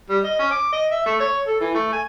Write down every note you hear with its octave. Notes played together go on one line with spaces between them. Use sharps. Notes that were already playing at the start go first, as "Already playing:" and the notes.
G3
D#5
C#4
D6
D#5
E5
A3
C#5
A4
E3
A3
G#5